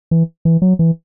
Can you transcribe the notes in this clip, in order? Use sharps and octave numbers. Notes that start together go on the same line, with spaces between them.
E3
E3
F#3
E3